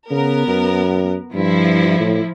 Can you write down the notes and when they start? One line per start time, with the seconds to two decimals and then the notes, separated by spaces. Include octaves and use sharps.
0.11 C#3 B3 A#4
0.47 F#2
1.34 G2 F3 E4
2.00 A2